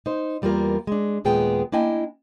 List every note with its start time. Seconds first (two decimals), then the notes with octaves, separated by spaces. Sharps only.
0.06 D#4 C5
0.42 E2 G3 A#3 F4 A#4
0.87 G#3 D4
1.25 D#2 A#2 G#3 B3 G#4 G5
1.72 A#3 D4 E4 D#5 G5 G#5